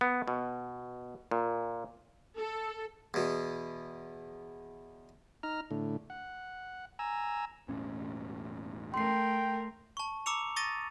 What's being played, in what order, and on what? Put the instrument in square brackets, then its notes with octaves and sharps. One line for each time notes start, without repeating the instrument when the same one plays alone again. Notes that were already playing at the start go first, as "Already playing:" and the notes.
[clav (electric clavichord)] B3
B2
A#2
[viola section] A4
[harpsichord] E2 B2
[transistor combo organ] D#4 A#5 F6
A2 D3
F#5
G#5 A#5 E6
[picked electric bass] E1 A2 C#4
[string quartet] A3 A#4 [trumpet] G5 [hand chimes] C6 C7
[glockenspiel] A5 C#6
A#5 D6 E6 C#7 F7
C#6 D#6 A6 A#6 D#7